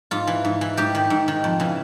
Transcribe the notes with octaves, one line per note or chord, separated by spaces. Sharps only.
G#2 F4
E3
G#2
E3
G#2 G4
D#3
G#2
D#3
F2
C#3 E3